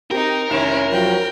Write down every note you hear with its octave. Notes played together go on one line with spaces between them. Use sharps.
C4 D#4 G4 A#4
F1 D#3 C#4 E4 E7
F3 F#3 G5